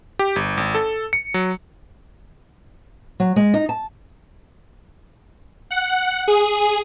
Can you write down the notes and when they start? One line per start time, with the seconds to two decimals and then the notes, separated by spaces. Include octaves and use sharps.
0.19 G4
0.36 G1
0.57 G#1
0.75 A4
1.13 C#7
1.34 F#3
3.20 F#3
3.36 G#3
3.54 D#4
3.69 A5
5.71 F#5
6.28 G#4